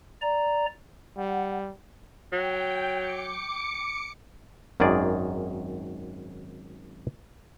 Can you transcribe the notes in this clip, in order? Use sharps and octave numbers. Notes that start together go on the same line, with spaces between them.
D5 A#5
G3 F#5
F#3 G5
D6 C#7
G#1 F#2 D#3 G#4 D5